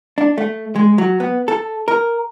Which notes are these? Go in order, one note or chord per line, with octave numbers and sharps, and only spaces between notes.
D4
A3
G#3
F#3
B3
A4
A#4